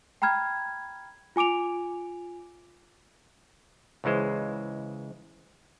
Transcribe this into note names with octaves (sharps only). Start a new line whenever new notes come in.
G5 A#5 B5 F6 G#6
F4 G#5 D6 D7 F7
C#2 C#3 E3 G#3 C5